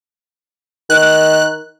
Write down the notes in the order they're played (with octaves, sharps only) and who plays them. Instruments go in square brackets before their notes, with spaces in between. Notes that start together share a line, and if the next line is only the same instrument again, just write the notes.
[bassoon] D#3 [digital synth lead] F#6